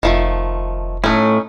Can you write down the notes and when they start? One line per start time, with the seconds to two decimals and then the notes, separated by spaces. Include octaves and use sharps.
0.03 F1 D#3 F3 A3
1.04 A2 A3 C#4 D#4